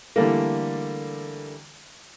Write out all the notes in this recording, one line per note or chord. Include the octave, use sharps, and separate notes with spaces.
D3 E3 G3 A3 A#3